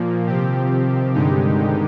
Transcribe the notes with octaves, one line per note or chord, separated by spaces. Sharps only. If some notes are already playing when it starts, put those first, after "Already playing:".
Already playing: A#2 F3 A#3
C3 D#3 F3 C4 G4
G2 D3 G#3 D#4 G4